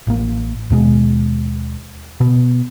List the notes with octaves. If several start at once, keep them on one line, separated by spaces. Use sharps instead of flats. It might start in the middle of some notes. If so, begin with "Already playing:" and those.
A1 A#3
D#2 B2 G#3
B2 B3